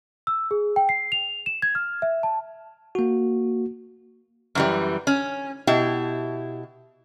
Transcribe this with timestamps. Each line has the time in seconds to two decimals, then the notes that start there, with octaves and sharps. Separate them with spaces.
0.27 E6
0.51 G#4
0.76 G5
0.89 C7
1.12 F7
1.46 E7
1.62 G#6
1.75 F6
2.02 E5
2.23 A5
2.95 A#3 F#4
4.55 F#2 E3 G3
5.07 C#4
5.67 B2 E4 G4